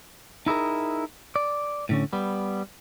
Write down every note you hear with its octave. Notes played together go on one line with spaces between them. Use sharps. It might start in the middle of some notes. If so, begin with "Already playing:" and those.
D#4 E4 G#4 A#4
D5
A2 D3 C#4
G3 B3